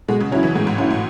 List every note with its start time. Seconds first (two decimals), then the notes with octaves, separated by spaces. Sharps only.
0.08 B2 G#3
0.20 C#3
0.32 F#3 C#4 E4
0.43 E3
0.55 A2 G#3
0.67 G#2
0.78 G#2 C#4 E4
0.91 A2